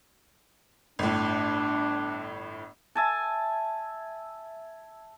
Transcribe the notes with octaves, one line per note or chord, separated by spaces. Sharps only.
G1 A2 D4
E5 G#5 A5